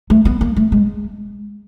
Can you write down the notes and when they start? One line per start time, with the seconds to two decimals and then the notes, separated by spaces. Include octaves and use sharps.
0.10 A3
0.25 B3
0.41 A#3
0.56 A3
0.72 G#3